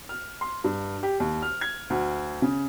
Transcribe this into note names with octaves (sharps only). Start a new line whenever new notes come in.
F6
C6
G2
G4
D#2
F6
G#6
D2
C#3